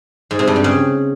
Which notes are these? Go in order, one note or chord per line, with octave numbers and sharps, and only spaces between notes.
G#2
C3
G2
G3
C#3